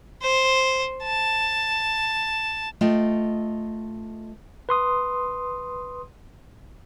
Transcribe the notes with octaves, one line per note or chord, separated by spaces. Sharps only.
C5
A5
A3 F4 D#5 G5
B4 C6 D#6